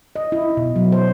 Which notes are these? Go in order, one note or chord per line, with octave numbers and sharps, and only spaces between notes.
D#5
E4
B2
F#3
C5